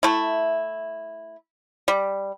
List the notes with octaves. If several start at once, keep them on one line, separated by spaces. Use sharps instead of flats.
A3 E4
G3